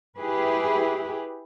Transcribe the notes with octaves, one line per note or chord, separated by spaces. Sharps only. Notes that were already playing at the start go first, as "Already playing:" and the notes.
E4 G4 G#4 B4